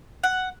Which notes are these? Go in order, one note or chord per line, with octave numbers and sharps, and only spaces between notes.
F#5